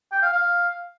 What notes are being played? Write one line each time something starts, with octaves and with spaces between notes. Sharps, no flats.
G5
F5
F5